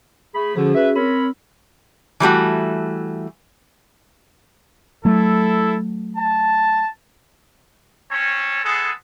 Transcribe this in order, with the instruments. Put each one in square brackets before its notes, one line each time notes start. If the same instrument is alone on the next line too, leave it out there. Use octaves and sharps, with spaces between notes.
[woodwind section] A3 G#4 B5
[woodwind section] D3 F3 [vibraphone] C#4 F#4 G#4
[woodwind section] B4 E5
[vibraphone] C4 E6 [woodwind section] A#4 C#5 B5
[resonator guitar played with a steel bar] E3 G3 A3 F#4
[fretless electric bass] F#3 A3 [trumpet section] E4 A4
[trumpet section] A5
C4 C#4 C#5 A5
G#3 B3 G#4 A4